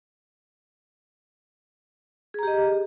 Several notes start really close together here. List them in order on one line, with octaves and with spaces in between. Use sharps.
G#4 A#5 G4 D#5